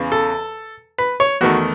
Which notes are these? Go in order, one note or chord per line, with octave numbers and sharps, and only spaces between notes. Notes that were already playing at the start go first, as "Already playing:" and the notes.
Already playing: E2 C#3 E3
A4
B4
C#5
E2 D#3 A3 F#4